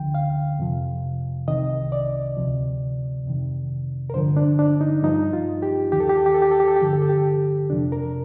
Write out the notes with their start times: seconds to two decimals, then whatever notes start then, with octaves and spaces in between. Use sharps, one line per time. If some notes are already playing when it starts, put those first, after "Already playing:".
Already playing: D2 D3 F3 G5
0.14 F5
0.59 F2 C3 F3
1.48 C2 C3 D#3 D#5
1.92 D5
2.37 D2 C3 F3
3.25 F2 C3 D#3
4.10 A#4
4.14 G2 D3 F3 C5
4.37 D4
4.59 D4
4.81 D#4
5.03 G2 F3 D#4
5.33 F4
5.62 G4
5.92 D#2 D#3 G4
6.00 A4
6.09 G4
6.17 A4
6.26 G4
6.34 A4
6.42 G4
6.51 A4
6.60 G4
6.68 A4
6.76 G4
6.81 G2 D3 F3 A4
6.93 G4
7.02 A4
7.09 G4
7.70 F2 C3 F3 D4
7.92 A#4